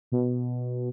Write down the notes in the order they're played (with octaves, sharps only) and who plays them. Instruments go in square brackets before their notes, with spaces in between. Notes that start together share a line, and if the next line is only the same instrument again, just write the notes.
[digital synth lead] B2